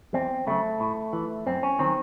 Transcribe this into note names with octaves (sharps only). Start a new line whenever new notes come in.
E2 C4
C#3 F#3 A3
A2
E3
F#2 C4
C#4
D#3 F#3 C4